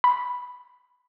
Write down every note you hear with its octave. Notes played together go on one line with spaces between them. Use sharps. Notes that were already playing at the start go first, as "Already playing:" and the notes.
B5